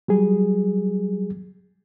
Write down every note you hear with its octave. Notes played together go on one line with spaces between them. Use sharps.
F#3 G3 G#4